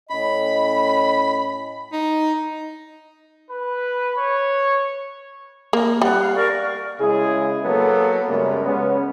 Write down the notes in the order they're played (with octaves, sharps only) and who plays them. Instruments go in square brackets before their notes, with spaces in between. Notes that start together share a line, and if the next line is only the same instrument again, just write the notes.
[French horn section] A2 C#4 D#5 [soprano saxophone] B5
[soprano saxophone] D#4
[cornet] B4
C#5
[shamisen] A#3
[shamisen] G3 [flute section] F#5
[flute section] F5
A#4 D5 C#6
[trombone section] C#3 G#3 E4 G#4
F#3 A#3 B3 A4
F#2 C#3 G3 G#3 G#4 A#4
G#3 B3 C#4